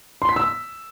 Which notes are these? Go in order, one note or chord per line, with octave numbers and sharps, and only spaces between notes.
C6
B6
E6